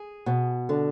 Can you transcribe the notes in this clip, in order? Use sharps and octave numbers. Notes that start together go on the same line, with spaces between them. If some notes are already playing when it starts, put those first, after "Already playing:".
Already playing: G#4
B2
D3